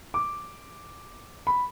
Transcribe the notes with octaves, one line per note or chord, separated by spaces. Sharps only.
D6
B5